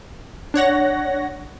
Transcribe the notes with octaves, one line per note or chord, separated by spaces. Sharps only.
D4 C#5 F#5 A#6